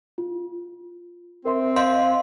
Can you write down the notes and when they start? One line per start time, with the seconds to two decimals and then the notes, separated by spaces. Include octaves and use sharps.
0.18 F4
1.45 C4 A#4 E5 C6
1.76 D#5 F5 C6 G6